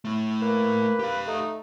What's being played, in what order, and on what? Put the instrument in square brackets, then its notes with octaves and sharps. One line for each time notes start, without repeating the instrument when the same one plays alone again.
[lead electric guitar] A3 E4
[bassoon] A#3 [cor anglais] B4
[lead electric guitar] G4 F5
[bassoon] A3 [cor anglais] D#4